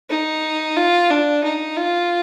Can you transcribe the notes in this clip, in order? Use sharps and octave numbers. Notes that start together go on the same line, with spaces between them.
D#4
F4
D4
D#4
F4